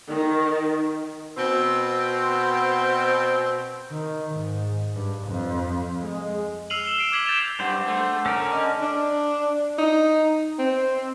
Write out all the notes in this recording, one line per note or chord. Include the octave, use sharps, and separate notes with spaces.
D#3
B2 C4
D#3
G#2
G2
F2
G#3
E6 F6 C7 D#7 F7 F#7
E7 G7
C7 D7 E7
D6 F6 G#6 B6 F#7 G7
G6 A6 D7 E7 F7 G7
G2 D4 C5 F#5
A3
C#4 A4 A#4 D5
D#5
D4
D#4
C4